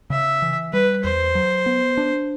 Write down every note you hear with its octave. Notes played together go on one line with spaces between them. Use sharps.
C#3 E5
E3
G3 B4
E2 C5
F#3
B3
D4